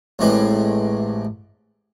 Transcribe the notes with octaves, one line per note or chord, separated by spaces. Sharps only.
A1 A2 C3 G#3 G4 B4